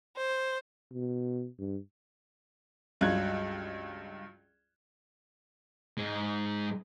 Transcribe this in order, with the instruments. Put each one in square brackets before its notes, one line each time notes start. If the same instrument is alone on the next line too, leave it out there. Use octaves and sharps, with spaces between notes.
[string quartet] C5
[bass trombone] B2
G2
[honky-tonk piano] C#2 G2 F#3 F4 F#6 G#6
[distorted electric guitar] G#2 G#3